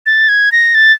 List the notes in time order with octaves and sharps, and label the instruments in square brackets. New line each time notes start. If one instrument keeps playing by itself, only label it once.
[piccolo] A6
G#6
A#6
A6